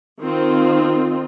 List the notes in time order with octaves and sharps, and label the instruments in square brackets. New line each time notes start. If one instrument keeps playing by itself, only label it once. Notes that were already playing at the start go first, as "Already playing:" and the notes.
[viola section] D#3 C4 F4